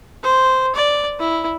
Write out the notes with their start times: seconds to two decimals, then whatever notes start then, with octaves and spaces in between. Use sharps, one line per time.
0.23 C5
0.75 D5
1.19 E4